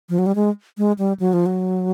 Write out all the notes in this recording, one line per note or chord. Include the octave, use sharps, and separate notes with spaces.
F3
F#3
G3
G#3
G#3
G3
F#3
F3
F#3